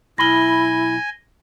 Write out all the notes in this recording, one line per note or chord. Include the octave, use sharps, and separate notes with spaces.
B1 E4 G#5 B5 A#6 G7